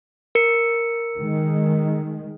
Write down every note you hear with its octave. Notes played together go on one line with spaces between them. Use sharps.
A#4 C#7
D#3 G#3